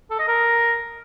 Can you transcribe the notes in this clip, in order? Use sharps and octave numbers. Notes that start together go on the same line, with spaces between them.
A4
D#5
A#4